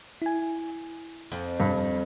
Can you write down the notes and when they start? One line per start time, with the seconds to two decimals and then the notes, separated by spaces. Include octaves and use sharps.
0.22 E4 G#5
1.32 F2
1.60 G2